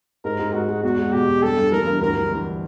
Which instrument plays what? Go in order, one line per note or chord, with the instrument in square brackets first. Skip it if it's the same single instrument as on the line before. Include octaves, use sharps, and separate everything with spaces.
[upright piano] G#2 [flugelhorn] A#4
[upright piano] G#2
[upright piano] G#3 [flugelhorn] F#4
[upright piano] G#3
[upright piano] E2 [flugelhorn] F#4
[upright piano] G#3
[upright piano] B2 [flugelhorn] G4
[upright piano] E2
[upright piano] G2 [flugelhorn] A4
[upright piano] G2
[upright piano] E3 [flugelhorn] A#4
[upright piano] G2
[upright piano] D2 [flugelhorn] A#4
[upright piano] E3
E3